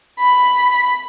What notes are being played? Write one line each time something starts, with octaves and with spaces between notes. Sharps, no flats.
B5